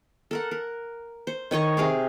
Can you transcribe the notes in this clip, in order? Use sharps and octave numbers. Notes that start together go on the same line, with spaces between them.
A4 A#4 F#5
A#4
C5
D#3 C#5 D#5 C#6
C3 G#4 F5 D6